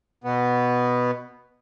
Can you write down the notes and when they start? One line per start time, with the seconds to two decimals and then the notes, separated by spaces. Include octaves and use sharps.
0.24 B2 B3